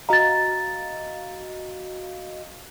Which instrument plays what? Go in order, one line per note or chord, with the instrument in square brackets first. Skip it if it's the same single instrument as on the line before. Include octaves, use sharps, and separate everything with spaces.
[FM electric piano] F#4 D#5 F5 [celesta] A#5 A6